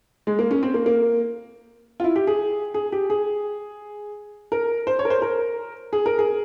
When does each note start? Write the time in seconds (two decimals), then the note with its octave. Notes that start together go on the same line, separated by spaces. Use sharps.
0.27 G#3
0.39 A#3
0.51 C#4
0.63 C4
0.74 A#3
0.86 A#3
2.00 F4
2.04 E4
2.16 G4
2.27 G#4
2.74 G#4
2.92 G4
3.10 G#4
4.52 A#4
4.87 C5
4.99 C#5
5.05 A#4
5.10 C5
5.22 A#4
5.93 G#4
6.06 A#4
6.19 G#4